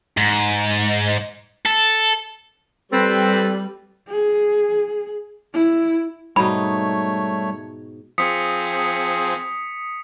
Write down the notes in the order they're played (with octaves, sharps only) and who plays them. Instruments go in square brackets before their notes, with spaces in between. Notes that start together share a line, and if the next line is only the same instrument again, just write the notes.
[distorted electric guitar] G#2
A4
[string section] G3 [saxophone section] C4 [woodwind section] A4 B4
[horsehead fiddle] G#4
E4
[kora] G#2 B2 D#4 [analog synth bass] G3 [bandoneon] A3 C#5 [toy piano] B5
[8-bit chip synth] F3 C4 G#4 [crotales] D#6 B6 C#7